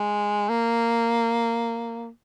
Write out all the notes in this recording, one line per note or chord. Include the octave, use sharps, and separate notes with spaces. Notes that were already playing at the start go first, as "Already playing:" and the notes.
Already playing: G#3
A#3